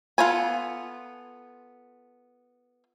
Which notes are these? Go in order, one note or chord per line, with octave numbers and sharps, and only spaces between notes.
B3 F4 A4 C#5 G#5